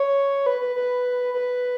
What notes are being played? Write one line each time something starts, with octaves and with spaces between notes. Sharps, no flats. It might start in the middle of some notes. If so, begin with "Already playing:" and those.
Already playing: C#5
B4
B4
B4
B4